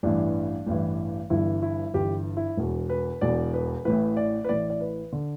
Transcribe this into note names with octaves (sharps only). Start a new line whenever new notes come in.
A1 G2 E3 D4
A1 G2 E3
G1 G2 E3 E4
E4
G1 G2 E3 G4
E4
E1 E2 B2
B4
E1 E2 B2 D5
B4
A1 A2 E3 B4
D5
B4
A1 A2 E3 D5
D5
B4
D3